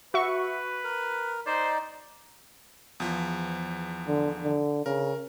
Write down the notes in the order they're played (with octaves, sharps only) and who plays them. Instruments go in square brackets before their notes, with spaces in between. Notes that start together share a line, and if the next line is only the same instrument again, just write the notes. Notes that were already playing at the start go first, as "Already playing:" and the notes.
[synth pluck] F#4 E5 C#6 [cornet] B4
[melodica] A#4
[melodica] D#4 D5 [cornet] C5
[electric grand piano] E2 F3
[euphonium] D3
D3
[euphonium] C#3 [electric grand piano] A#4